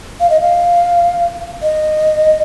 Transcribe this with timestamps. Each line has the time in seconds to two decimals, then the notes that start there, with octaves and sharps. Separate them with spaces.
0.20 F5
0.30 D#5
0.41 F5
1.63 D#5